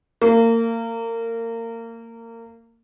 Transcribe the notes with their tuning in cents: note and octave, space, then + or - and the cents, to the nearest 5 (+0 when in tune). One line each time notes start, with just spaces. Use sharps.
A#3 -30